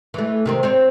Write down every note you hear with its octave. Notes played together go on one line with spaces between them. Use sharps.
E3 A3
C3 D#3 C4
C4 C5 C#5